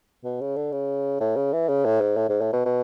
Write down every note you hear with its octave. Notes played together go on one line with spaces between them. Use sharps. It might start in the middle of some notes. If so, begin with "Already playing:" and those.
B2
C#3
D3
C#3
A2
C#3
E3
C#3
A2
G#2
A2
G#2
A2
B2
B2